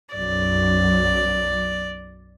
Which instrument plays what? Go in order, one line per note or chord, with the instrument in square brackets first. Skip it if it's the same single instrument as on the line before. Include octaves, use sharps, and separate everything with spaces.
[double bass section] B1 F#2 F#3 [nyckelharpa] D5